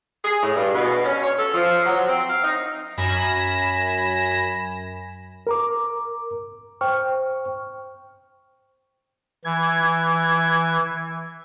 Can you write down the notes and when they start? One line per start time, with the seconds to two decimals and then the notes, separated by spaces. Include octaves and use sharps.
0.24 G#4
0.43 A2
0.56 G2
0.74 B2
1.04 C#4
1.23 C#5
1.38 A4
1.52 F3
1.86 F#3
2.08 C4
2.30 F5
2.44 D#4
2.97 F#2 G#5 B5 A#6 E7
5.47 A#4 A#5 D6
6.81 C5 G5 C#6 F6
9.44 E3 G#6